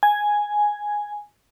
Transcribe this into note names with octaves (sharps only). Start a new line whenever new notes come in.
G#5